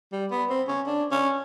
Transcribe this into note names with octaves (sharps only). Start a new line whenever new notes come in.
G3
B3
C4
C#4
D4
C#4